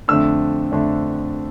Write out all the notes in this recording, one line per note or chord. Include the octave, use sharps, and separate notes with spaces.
F2 D3 A3 D4 E6
F2 D3 A3 D4